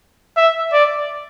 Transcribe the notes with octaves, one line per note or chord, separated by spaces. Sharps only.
E5
D5